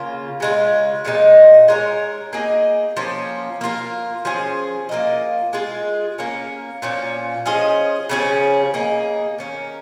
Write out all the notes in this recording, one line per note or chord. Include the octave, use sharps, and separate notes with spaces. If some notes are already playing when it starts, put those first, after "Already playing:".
Already playing: C#3 A#3 F4
C#3 G#3 F4
A#2 F3 G#3 D#4
G#3 D#4 A#4 C#5
A#3 D#4 G#4 D#5
F3 A#3 C#4
A#3 F4 A#4
F3 C#4 G#4
A#3 F4 A#4 D#5
G#3 F4 G#4
A#3 C#4 A#4
A#2 F3 C#4
F3 C#4 G#4 D#5
C#3 F3 C#4 G#4
A#3 D#4 G#4
D#3 C#4 A#4